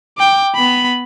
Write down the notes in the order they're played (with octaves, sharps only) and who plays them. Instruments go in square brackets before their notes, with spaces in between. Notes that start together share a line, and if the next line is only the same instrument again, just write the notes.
[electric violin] G5 D6
B3 B5